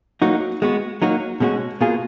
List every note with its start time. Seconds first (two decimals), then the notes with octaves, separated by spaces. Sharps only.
0.22 F#3 A#3 D#4 F#4
0.62 G#3 B3 F#4
1.02 F#3 A#3 D#4 F#4
1.40 B2 G#3 C#4 F#4
1.81 B2 A#3 F4 G#4